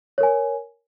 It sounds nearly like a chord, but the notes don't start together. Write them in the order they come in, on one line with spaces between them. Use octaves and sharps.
C#5 A#4 G#5